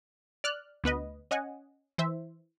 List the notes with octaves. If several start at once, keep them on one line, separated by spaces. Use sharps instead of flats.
D5 F6 F#6
D2 B3 B4 D#5
C#4 D#5 F#5 G#5
E3 C5 E5